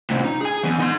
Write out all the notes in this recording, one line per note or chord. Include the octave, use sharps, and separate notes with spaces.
A2 C3
D#4
G#4 G#5
E3 B3
D#4 C6